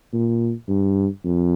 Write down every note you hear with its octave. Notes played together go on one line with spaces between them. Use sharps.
A#2
G2
F2